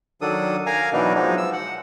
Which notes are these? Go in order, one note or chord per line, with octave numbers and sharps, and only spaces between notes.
D#3 F#3 D4 A4 D#6
A#4 F5 G#5 A#5
B2 E3 F#3 D4 D#4
F3 F#3 G#3 D#4
F3 E6
F#5